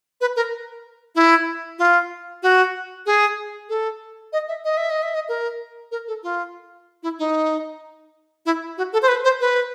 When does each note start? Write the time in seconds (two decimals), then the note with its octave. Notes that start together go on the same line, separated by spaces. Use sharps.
0.21 B4
0.36 A#4
1.15 E4
1.79 F4
2.43 F#4
3.06 G#4
3.69 A4
4.33 D#5
4.48 E5
4.65 D#5
4.77 E5
4.90 D#5
5.03 E5
5.15 D#5
5.29 A#4
5.91 A#4
6.08 A4
6.23 F4
7.03 E4
7.19 D#4
8.46 E4
8.78 F#4
8.93 A4
9.02 C5
9.08 B4
9.24 C5
9.41 B4